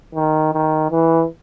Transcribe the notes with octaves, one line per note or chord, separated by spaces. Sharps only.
D#3
D#3
E3